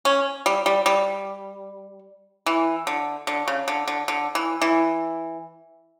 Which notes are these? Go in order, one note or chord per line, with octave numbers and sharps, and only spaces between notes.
C#4
G3
G3
G3
E3
D3
D3
C#3
D3
D3
D3
E3
E3